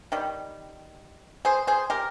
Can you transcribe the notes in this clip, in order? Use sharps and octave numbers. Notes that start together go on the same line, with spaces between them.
D#3 G3
G#4 C5
G#4 C5
G4 A#4